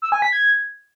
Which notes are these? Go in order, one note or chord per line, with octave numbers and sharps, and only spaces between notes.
E6
G#5
B6
G#6